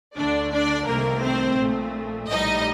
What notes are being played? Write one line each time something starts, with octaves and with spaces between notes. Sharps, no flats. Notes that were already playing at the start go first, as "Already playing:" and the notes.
D2 D3 A3 D4 D5
D4 D5
C2 C3 D#3 A3 A#3 A#4
C4 C5
A#1 A#2 A3
A#1 A2 G3 D#4 D#5